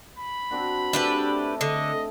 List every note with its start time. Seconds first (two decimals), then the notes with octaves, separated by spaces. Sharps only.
0.18 B5
0.51 C4 D4 F#4
0.93 A3 D4 E4 G4 G#4 B4
1.61 D3 D#5